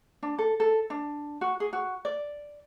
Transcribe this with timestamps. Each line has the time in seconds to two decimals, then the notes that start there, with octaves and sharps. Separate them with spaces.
0.23 D4
0.38 A4
0.60 A4
0.90 D4
1.41 F#4
1.60 G#4
1.73 F#4
2.05 D5